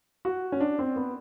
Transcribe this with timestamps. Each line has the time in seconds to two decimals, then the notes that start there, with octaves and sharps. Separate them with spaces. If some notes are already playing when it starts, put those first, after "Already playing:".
0.25 F#4
0.52 C#4
0.60 D4
0.79 C4
0.96 B3